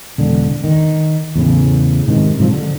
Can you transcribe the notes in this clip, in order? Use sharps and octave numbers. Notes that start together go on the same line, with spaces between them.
E1 D3
D#3
E2 A2 C#3
G#2 C3 D#3
G#2 C3 F3
D3